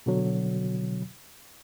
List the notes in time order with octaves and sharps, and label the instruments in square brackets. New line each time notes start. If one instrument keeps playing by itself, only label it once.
[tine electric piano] B2 D3 F#3